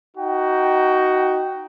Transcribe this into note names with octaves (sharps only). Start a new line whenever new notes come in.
D#4 F#4 G5